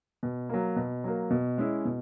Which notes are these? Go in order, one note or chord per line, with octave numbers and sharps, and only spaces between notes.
B2
F#3 A#3
B2
F#3 A#3
B2
G#3 C#4 E4
B2